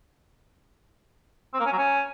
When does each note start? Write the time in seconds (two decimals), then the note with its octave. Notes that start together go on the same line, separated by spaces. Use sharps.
1.54 C4
1.60 A#3
1.66 C#4
1.72 F#3
1.78 C#4